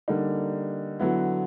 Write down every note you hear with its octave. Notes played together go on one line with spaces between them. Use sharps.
D3 G3 A#3 D#4
D3 F#3 B3 E4